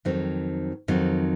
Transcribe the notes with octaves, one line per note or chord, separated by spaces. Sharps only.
F2 D#3 F#3 C4
F2 D#3 F#3 C4